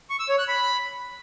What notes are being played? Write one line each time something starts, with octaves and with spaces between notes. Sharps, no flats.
C#6
E6
C#5
F#6
B5